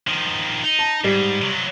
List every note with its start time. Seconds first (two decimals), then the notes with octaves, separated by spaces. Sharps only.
0.07 D#3 F3
0.64 D#4
0.79 A5
1.04 G#2 G3
1.42 C3 F#3